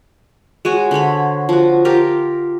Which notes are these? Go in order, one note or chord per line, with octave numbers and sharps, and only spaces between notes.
G#3 F#4 C#5
D3 C5 C#5 B5
F3 F#4
F4 G4 A#4